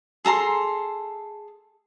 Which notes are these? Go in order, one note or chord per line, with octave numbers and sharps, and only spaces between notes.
G#4 A4 A#5 C6